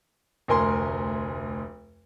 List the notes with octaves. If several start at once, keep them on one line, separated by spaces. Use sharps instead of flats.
F1 D2 A#4 G#5 C6